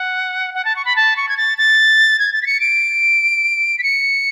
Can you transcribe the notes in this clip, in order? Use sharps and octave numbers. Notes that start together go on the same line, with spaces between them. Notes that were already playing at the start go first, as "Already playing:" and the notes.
Already playing: F#5
F#5
A5
C#6
B5
A5
C#6
G#6
A6
A6
G#6
A6
B6
C#7
D7
B6
C#7